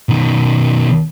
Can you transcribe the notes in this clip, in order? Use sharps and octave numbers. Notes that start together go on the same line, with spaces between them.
B2 D#3